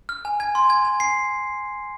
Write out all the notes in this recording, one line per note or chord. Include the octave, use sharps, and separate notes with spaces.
F6
G#5
G#5 G#6
C6
G#5 G#6
G#5
G#5 C7